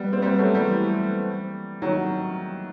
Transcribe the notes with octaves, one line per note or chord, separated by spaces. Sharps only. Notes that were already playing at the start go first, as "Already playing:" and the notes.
Already playing: G3 B3
C4
G3 B3
F#3 A3
E3 G3
D#3 F#3